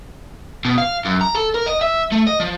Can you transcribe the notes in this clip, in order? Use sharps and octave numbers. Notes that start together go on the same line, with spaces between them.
B2
F5
F#2
A#5
A4
A#4
D#5
E5
A3
D#5
F3